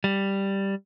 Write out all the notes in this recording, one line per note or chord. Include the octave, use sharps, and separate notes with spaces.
G3